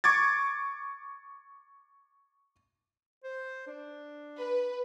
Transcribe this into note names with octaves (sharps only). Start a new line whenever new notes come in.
C#6 D6 G#6 A6
C5
D4
B4